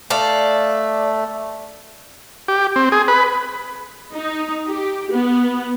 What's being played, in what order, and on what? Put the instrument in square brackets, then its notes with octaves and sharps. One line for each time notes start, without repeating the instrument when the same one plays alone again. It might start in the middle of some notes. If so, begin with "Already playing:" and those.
[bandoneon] A3 [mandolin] A4 F5 [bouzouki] D5
[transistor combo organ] G4
C4
G#4
B4
[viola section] D#4
G4
B3